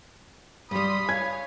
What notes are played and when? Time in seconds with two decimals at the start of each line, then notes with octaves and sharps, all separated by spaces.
0.71 G2 G3 B5 C6 D#6
1.09 C#5 F5 G#5 G#6